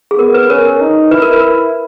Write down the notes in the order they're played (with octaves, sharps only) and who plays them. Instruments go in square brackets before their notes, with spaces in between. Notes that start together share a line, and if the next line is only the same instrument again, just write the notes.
[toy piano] G#4
[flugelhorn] B3 [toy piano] A#4
[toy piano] B4
[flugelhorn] C#4 [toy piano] A#4 C#5
[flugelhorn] D#4
[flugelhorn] E4 [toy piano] B4
[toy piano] A#4
B4